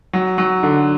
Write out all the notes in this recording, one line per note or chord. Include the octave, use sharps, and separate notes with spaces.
F#3
F#3
D3